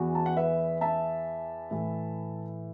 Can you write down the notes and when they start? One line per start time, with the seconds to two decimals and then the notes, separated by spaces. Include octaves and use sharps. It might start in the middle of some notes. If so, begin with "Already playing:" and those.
Already playing: E2 E3 F#4
0.15 A5
0.26 F#5
0.37 B4 E5
0.81 E5 A5
1.71 A2 E3